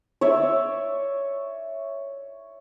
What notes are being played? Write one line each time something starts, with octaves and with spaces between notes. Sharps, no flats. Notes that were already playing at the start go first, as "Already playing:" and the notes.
C#5 D5 E5